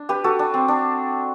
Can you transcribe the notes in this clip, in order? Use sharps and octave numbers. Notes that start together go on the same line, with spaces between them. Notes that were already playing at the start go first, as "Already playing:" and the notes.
Already playing: D4
G4 B4
F#4 A4
D4
C4
D4